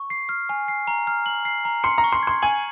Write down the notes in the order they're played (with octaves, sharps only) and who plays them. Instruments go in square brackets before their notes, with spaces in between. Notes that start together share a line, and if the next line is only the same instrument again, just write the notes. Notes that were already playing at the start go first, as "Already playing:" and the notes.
Already playing: [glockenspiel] C#6
C7
F6
G#5
C7
A#5
F6
F#7
C7
A#5
[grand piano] C6 [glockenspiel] C#7
[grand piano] A#5
[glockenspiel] C#6
[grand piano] C6
[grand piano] C6 [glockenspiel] G#6
[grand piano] G#5 [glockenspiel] F#7